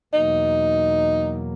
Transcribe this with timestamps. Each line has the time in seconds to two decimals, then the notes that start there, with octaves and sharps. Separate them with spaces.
0.13 E2 B2 F#3 A#3 D#4